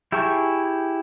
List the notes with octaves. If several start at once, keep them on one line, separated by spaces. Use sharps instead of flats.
E4 G4 G#4 A5 C#6